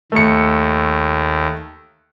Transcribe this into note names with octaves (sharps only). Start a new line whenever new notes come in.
D#2 A3 C#7